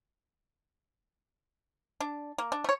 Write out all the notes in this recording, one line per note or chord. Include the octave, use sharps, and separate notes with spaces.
D4
A#3
D4
A3 C#5